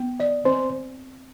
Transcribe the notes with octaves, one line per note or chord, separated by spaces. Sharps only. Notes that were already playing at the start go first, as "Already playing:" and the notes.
Already playing: B3
D5 D#5
C4 C5